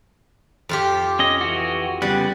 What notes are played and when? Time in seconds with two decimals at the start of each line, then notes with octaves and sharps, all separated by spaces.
0.69 F2 F4 G4
1.19 C#4 D#5
1.41 E3 F#4
2.02 C#3 G3 B3 F#6